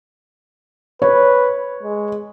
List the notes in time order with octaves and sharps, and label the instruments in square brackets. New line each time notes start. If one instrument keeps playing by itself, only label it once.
[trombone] B4 [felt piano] C#5
[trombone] G#3